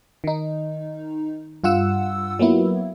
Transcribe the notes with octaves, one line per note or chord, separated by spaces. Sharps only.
D#3 D#4
G2 F4 F#5 E6
F#3 A#3 B3 E4